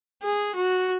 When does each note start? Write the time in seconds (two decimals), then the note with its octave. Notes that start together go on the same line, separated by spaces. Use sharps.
0.23 G#4
0.55 F#4